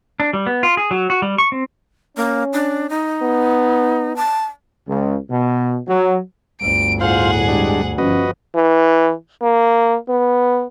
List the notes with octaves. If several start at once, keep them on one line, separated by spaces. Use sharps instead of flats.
D4
G3
B3
F4
G#4
F#3
F#4
G3
C#6
C4
A#3 C#4
D4
D#4
B3
A5
C#2
B2
F#3
G1 D2 D7
A2 F4 G#4 C5 F5 F#5
G3 G#3 D4
G1 F3 C#4 F#4 B4 D#5
E3
A#3
B3